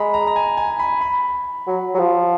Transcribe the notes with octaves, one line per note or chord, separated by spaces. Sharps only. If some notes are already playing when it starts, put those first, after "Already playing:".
Already playing: G#3 A#5 B5
A#5
A#5
G#5
G#5
B5
B5
F#3
F#3
F3